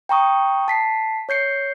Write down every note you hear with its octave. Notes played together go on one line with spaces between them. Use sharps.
G5 A#5 C#6 D#6
A5 B6 C7
C#5 G6 C7 C#7